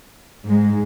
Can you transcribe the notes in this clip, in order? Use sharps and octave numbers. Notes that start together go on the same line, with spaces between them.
G#2 G#3